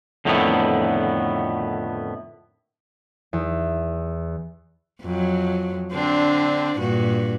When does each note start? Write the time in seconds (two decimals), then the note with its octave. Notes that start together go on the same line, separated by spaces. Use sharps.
0.25 F2 A2 D3 D#3 A3 B3
3.33 E2
5.02 F2 F#3
5.93 D3 C4 D4
6.79 G2 A#2 F#4